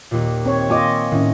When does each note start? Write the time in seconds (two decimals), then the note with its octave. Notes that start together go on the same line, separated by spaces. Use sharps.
0.11 D#2 A#2
0.46 C4 C#5
0.70 A#3 F4 D#5 G#5 D6
1.12 A2 D#3 C#4